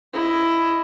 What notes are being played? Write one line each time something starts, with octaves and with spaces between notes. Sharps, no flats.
E4 D#5